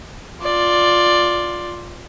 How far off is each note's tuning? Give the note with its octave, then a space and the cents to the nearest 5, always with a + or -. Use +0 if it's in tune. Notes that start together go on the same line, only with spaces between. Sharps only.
F4 +10 D5 +0